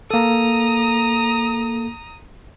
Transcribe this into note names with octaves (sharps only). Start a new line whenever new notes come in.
A#3 A4 A#5 D#6